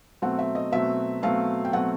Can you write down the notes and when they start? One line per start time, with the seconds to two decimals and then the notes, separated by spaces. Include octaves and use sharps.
0.22 B2 F#3 A3 C4 F#5
0.39 E5
0.55 D#5
0.72 B2 F#3 A3 C4 E5
1.23 B2 F#3 A3 C4 F5
1.65 G5
1.73 B2 F#3 A3 C4 F#5